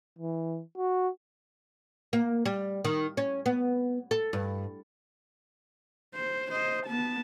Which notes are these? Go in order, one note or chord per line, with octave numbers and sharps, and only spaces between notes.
E3
F#4
A#3
G3
D#3
C#4
B3
A4
G2
C5
C5 D#5
B3 A5